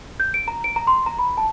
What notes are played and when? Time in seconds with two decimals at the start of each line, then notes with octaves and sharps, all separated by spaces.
0.20 G6
0.34 D7
0.48 A#5
0.64 D7
0.76 A#5
0.87 C6
1.06 A#5
1.19 B5
1.37 A5